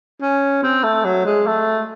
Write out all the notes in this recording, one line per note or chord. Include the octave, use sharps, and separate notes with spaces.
C#4
C4
A3
F#3
G#3
A3